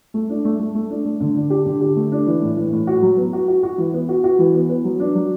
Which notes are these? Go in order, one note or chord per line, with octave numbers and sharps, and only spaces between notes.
A3
D4
A3
A3
A3
D4
A3
D3
D4
G4
D3
G4
A3
D4
E3
A2
E3
A2
F#4
F#3
B3
F#4
F#4
F#4
E3
B3
F#4
F#4
E3
B3
B3
F#3
D4
F#3